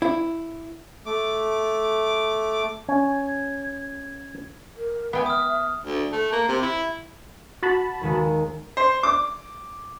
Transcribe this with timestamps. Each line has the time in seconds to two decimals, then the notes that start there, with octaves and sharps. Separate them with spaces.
0.02 E4
1.06 A3 D6
2.89 C#4 G#6
4.76 A#4
5.13 B3 E5 G5 G#5
5.26 D#6 F6
5.84 D2
6.12 A3
6.32 A#3
6.48 C3
6.62 E4
7.63 F#4 A5 B5
8.01 D#2 D#3 G#3
8.77 C5
9.03 D6